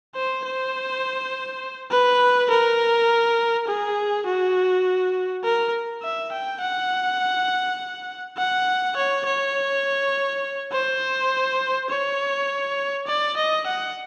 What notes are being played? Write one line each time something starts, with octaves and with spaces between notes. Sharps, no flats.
C5
C5
B4
A#4
G#4
F#4
A#4
E5
G5
F#5
F#5
C#5
C#5
C5
C#5
D5
D#5
F#5